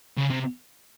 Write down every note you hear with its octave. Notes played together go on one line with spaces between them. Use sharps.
C#3
C3